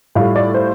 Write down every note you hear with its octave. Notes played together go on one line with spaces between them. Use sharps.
A2 G3 F4 F5
D5
C5